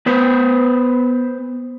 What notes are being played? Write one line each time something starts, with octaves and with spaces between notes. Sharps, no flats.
B3 B4 C5